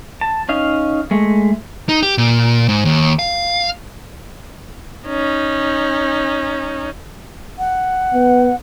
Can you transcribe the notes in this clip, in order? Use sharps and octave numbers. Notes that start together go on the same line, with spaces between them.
A5
C#4 D#4 F5
G#3 A3
D#4
G4
A#2
G#2
D#2
F5
C#4 D#4
F#5
B3